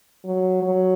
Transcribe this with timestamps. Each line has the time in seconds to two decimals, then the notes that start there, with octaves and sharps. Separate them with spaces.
0.25 F#3
0.62 F#3